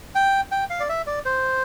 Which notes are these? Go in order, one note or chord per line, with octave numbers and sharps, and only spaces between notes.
G5
G5
F5
D5
E5
D5
C5